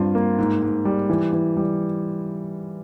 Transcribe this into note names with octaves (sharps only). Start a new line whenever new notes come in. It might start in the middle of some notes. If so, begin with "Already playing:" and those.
Already playing: G2 C4 F4
A#3
G#2
G#2
G3
E3
E3
G3